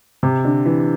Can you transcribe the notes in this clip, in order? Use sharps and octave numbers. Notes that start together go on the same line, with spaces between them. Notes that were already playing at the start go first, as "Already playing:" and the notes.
C3
D3
E3